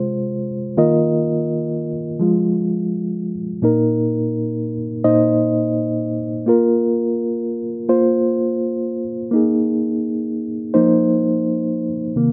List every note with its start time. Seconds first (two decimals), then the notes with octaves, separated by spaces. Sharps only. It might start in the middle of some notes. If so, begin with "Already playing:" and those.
Already playing: C3 G#3 F4 C5
0.77 D#3 A#3 F4 A#4 D#5
2.20 F3 G#3 F4
3.62 A#2 A#3 D#4 A#4
5.04 A#2 A#3 D#4 C5 D#5
6.46 A#3 F4 A#4
7.89 A#3 F4 C5
9.31 A#3 D#4 G#4
10.74 F3 A#3 D#4 C5
12.16 C3 D#3 A#3